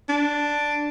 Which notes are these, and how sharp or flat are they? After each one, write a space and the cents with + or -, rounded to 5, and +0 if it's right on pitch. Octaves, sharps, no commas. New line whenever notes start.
D4 +0